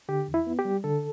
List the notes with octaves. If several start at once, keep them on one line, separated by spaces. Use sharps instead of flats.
D3 G4
E2
E4
B3
G4
G3
D3 A4